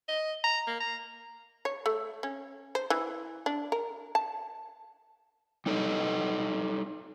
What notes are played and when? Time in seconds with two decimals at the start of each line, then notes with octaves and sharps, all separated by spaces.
0.08 D#5
0.44 A#5
0.67 A#3
0.80 A#5
1.65 C#5
1.86 A3
2.23 C#4
2.75 C5
2.90 E3
3.46 D4
3.72 A#4
4.15 A5
5.66 G3 D#4 A4 C#5 D#5